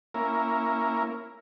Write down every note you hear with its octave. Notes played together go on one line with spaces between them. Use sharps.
A#3 C#4 E4 A#4